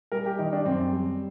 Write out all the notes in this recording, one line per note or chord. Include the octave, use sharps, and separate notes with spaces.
G3 A#4
G4
D#3 D#4
D4
F#2 C4
G3